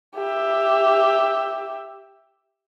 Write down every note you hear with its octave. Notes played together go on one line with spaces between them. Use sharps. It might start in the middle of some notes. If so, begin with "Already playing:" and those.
G4 E5